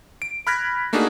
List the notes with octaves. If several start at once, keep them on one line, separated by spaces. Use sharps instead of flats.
D7
B5 F6 F#6 G#6 A#6 B6
A3 A#3 D4 D#4 F#4 G#4